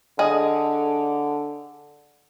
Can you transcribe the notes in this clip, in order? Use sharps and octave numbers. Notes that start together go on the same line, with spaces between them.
D3 G#4 D#5